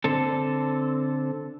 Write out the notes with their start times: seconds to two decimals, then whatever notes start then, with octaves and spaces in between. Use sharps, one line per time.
0.04 D3 C4 A4